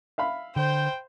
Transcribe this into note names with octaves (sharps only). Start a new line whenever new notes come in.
E5 F5 B5
D3 C5 G5